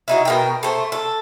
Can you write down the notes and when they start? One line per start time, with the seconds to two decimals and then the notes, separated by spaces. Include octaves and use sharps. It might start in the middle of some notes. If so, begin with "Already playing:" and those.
0.08 F#3 D#4 E4
0.25 B2 A#4 G5
0.63 A3 C5
0.92 A4